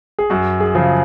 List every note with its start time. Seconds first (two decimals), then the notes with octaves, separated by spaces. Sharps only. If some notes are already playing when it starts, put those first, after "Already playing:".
0.19 G#4
0.30 F#2 F#4
0.60 G#4
0.75 C#3 F3